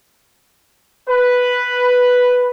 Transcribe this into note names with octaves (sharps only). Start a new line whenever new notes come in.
B4